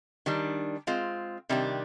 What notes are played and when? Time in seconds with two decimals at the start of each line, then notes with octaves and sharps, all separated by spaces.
0.26 D#3 G3 D4
0.87 G#3 C4 F4
1.49 C3 D#3 G3 D4 G4